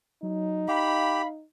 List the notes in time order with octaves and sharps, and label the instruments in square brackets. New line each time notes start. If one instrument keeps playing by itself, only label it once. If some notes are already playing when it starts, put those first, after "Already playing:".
[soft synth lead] F#3 [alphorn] D#4
[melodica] G4 [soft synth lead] F5 [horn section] B5